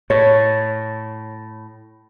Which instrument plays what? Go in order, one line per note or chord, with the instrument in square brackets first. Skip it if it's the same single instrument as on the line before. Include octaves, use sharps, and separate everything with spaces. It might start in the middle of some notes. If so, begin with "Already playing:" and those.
[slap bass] A2 [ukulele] C#5